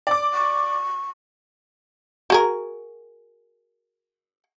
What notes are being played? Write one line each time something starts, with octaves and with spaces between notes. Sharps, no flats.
D5 D6
C#6
F#4 G#4 A#4